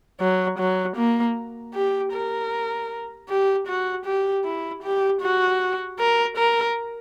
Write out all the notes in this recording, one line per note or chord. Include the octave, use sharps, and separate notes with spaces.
F#3
F#3
A#3
G4
A#4
G4
F#4
G4
E4
G4
F#4
A#4
A#4